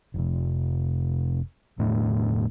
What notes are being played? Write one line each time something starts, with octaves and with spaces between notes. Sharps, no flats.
F1 C3
E1 A2 A3 D4